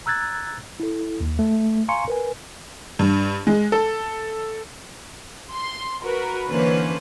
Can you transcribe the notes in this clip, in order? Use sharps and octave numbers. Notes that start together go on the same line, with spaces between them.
A#5 E6 F#6 G#6 A6
E4 A4
D#2
A3
F5 G#5 A#5 C6 C#6 C#7
A#4 B4 G#5
G2
G#3
A4
C6
F#4 A#4 B4
D3 E3 A#3 C#4 B4 C5